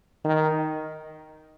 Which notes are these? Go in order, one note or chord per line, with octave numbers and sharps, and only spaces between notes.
D#3